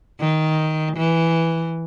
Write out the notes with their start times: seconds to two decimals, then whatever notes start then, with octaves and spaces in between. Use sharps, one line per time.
0.20 D#3
0.96 E3